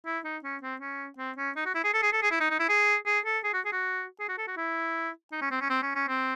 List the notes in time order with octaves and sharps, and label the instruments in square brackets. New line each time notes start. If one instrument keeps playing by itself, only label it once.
[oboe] E4
D#4
C#4
C4
C#4
C4
C#4
D#4
F#4
E4
G#4
A4
G#4
A4
G#4
E4
D#4
D#4
E4
G#4
G#4
A4
G#4
F#4
G#4
F#4
G#4
F#4
A4
F#4
E4
D#4
C#4
C4
C#4
C4
C#4
C#4
C4